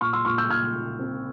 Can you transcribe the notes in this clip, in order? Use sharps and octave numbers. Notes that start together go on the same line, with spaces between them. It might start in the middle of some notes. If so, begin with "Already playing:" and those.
A#2 C#6 F6
C6 E6
A#2 C#6 F6
E6 G6
A#2 F6 G#6
A#2
C4